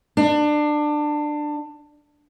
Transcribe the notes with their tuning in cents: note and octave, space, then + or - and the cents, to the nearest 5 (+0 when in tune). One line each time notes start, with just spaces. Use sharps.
D4 +20